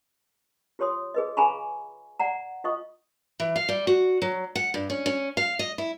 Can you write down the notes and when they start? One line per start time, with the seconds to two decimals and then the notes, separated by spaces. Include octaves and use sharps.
0.79 F4 G4 C#5 C6 D#6
1.14 G#4 B4 D#5
1.37 G#4 F5 G#5 A#5 B5 C#6
2.20 D5 F#5 A#5
2.64 F4 D#5 F5 C#6 D#6
3.40 E3
3.56 F5
3.69 G3
3.87 F#4
4.22 F#3
4.56 F#5
4.74 G2
4.90 C#4
5.06 C#4
5.37 F5
5.59 D#5
5.78 E4